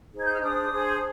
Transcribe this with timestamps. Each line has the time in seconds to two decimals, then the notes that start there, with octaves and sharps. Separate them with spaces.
0.13 D#4 G#4 C5 G#6
0.25 G6
0.33 F6
0.41 D4 G#4 C5 D#6
0.69 D4 G#4 C5